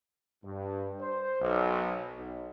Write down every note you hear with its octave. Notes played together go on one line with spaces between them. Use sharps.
G2
C5
B1
B1